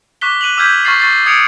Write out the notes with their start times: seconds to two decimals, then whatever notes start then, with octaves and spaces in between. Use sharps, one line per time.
0.21 C#6 D6 F#6 B6 G7
0.41 F#6 D#7 F7 F#7
0.57 D6 E6 F6 G6 G#6 B6
0.84 C#6 F6 A6 C7 F#7
1.00 C#6 A6 C7
1.26 D#6 G#6 C#7 D7 F7